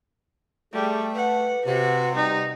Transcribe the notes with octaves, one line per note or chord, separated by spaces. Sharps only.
G3 A3 G#4
B4 F#5
C3 F#4
G3 D#4